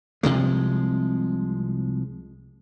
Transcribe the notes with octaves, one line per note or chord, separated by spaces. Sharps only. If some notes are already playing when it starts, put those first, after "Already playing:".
C2 C3 F3 G#3